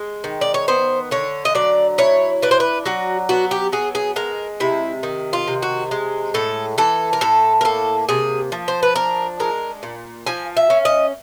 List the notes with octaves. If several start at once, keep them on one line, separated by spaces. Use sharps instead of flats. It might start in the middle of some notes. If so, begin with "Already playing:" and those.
Already playing: G#3
D#3
D5
C#5
B3 C5
D3 C#5
D#5
F#3 D5
E4 C#5
D4 B4
C5
B4
F#3 F#4
B3 F#4
G4
F#3 G#4
G#4
G#3 A#4
C3 E4
D#3
F4
C3
F#4
G#3
A2 A4
E3 A4
A#4
A2 A4
A#4
A#3 A4
C3 G#4
F3
C5
B4
D4 A#4
G#3 A#4
A#2
F3 G#5
E5
C#4
D#5